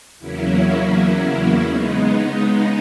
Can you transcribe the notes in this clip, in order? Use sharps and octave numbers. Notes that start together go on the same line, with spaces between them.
E2 C#3 F#3 A#3 C#4 E4
C#3 G#3 B3 D#4
D#4